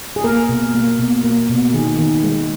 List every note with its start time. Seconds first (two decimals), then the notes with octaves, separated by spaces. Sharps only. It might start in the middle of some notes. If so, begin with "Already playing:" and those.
0.16 G#4
0.24 A#3 A#4
0.49 B2
0.74 A#3
0.99 B2
1.24 A#3
1.49 B2
1.74 D#3 G#4
1.99 D#3
2.24 G#3